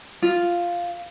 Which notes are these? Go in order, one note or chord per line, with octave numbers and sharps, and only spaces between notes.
F4